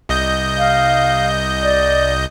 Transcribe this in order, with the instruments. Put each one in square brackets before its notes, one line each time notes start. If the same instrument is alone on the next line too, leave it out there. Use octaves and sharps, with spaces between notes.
[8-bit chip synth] C2 D#5 G6
[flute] F5
D5